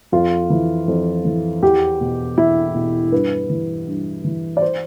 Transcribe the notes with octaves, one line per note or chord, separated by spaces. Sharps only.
F2 F4
E3
F2
E3
E2 G4
B2
E2 E4
B2
G2 B4
E3
G2
E3
D5
C5